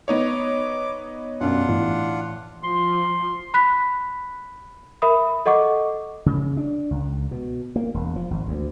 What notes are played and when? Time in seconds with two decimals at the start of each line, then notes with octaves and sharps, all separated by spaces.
0.08 B3 D#4 C#5 D6
1.41 B1 F#2 D4 F4 F#5
1.69 A1
2.64 F3 C6
3.54 B5 F#6 B6
5.02 A#4 E5 B5 D#6
5.46 A4 D#5 F#5 C#6 D6
6.26 C#3
6.57 D4
6.91 C#2
7.31 B2
7.76 A#3
7.94 E1
8.16 F3
8.31 G#1
8.48 D2